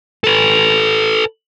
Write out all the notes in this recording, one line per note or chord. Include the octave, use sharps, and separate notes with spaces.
A4 B4